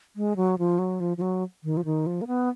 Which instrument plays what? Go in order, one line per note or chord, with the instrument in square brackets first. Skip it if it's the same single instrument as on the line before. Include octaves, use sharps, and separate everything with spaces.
[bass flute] G#3
F#3
F3
F#3
F3
F3
F#3
D#3
F3
D#3
F3
A#3
B3